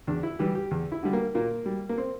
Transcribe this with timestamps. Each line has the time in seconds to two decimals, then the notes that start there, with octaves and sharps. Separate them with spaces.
0.07 E2 D4
0.23 E4
0.39 E3 G3 G4
0.55 G4
0.71 E2
0.92 E4
1.03 D3 G3
1.13 A#3
1.35 A#2 A#3
1.66 G3
1.89 A#3
1.98 C4